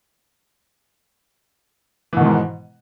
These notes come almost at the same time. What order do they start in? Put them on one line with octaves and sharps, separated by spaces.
E3 B2 D#3 G#2